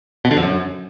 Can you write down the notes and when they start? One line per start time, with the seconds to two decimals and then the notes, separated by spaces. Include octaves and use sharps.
0.25 B2
0.31 D3
0.37 F2
0.43 F#2